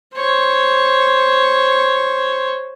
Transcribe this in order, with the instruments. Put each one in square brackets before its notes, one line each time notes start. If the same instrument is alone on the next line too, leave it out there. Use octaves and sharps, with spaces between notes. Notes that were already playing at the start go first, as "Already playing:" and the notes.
[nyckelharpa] C5 C#5